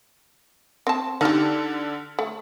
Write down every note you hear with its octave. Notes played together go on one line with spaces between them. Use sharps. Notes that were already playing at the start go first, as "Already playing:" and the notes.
C4 A5
D3 D#4 G4 A4 F6
A3